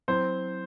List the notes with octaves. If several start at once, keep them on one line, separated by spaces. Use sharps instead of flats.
F#3 C4 E4 C5